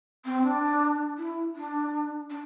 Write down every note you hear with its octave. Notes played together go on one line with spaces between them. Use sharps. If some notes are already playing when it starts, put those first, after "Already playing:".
C4
D4
E4
D4
D4